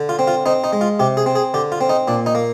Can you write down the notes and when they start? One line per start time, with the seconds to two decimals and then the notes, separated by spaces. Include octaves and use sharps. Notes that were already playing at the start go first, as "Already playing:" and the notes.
Already playing: D3
0.09 F4
0.19 C4
0.28 F4
0.46 C4 D#4
0.64 D#4
0.73 G#3
0.81 F4
1.00 C3 G4
1.17 G#4
1.26 C4
1.35 G#4
1.54 D3 G4
1.72 F4
1.81 C4
1.89 D#4
2.08 A#2 D4
2.26 D#4
2.35 A#3